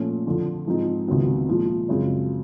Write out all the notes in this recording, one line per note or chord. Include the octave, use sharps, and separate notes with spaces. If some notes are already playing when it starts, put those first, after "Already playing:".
Already playing: A#2 F3 A3 C#4
F2 D3 F3
G#2 F3 G#3 C4 D#4
C#2 C3 D#3 F#3 B3
A#2 F3 G#3
F#2 C#3 F3 G#3 C4